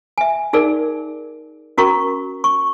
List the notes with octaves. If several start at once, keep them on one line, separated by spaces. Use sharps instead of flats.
E5 G#5
D#4 G#4 A#4 D5
C#4 F#4 A#4 A#5 C#6
C#6